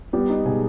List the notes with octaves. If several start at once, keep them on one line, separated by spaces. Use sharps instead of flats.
G3 B3 G4
D#4
B2 G#3 G#4